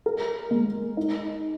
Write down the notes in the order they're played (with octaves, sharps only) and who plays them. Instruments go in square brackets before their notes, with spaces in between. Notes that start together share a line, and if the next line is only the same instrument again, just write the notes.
[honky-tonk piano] A#4
G#3
D#4